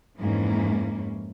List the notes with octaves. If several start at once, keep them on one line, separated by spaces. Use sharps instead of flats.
F2 G#2 E3 A#3 C#4